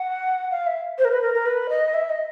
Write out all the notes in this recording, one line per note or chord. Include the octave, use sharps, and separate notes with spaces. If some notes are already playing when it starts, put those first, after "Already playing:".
Already playing: F#5
F5
E5
C5
A#4
B4
A#4
A#4
B4
D#5
E5
D#5